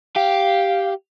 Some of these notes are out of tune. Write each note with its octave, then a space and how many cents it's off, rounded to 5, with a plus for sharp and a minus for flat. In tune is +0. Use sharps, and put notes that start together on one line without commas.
G4 +0 F5 +0